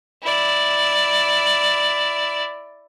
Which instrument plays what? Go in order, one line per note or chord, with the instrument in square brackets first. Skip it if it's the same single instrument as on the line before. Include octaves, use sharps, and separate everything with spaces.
[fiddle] E4 D5